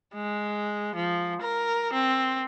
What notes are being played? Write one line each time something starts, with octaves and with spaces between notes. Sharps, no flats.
G#3
F3
A#4
C4